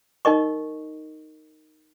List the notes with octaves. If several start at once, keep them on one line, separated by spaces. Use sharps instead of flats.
D#4 A#4 D#5 C#6